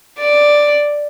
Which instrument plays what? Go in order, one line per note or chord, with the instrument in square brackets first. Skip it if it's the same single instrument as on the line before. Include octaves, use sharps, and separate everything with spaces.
[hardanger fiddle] D5